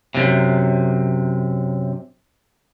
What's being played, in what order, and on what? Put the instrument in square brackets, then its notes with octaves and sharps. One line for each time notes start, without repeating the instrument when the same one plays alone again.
[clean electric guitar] F#2 A2 C3